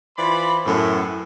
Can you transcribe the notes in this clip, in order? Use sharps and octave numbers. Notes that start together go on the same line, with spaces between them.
E3 F4 C5 D5 B5
F#2 A2 B3